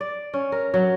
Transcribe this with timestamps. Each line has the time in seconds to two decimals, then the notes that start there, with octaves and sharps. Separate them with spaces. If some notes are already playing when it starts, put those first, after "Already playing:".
0.01 D5
0.34 C#4
0.52 A#4
0.74 F#3